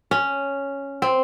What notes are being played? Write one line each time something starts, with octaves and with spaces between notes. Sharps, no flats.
C#4
C4